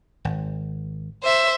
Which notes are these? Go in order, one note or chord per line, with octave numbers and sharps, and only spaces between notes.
G#1
C5 E5